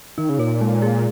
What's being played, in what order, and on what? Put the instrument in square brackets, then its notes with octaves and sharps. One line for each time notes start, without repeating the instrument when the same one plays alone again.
[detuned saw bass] D#3 [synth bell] D#4
[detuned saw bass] C#3
[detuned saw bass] A#2 [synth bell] C#5
[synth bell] G#3
G#4